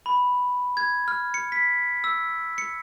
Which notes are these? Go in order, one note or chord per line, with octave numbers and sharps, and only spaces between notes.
B5
G#6
F6
C#7
B6
E6
C#7